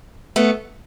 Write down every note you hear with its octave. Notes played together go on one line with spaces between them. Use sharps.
A3 B3